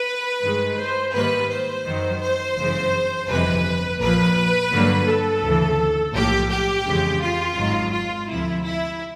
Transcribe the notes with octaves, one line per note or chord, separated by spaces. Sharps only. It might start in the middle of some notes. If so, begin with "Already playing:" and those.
Already playing: B4
G2 D#3 G#3
C5
G#2 D#3 G3 A#3 B4
C5
F#2 D#3 F#3
C5
G1 F#2 C#3 E3 G#3
G1 F2 C3 E3 G#3 B4
A#1 A#2 F3 A#3 B4
G2 D3 F#3 A#3
A4
D2 C#3 E3
B1 A2 F3 A#3 G4
G4
F2 C#3 E3 G#3
F4
G#1 G#2 D#3 F#3
F4
D2 C3 F3 E4
E4